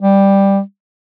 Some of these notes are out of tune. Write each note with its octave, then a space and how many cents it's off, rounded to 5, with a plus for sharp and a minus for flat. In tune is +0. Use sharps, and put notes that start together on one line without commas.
G3 +5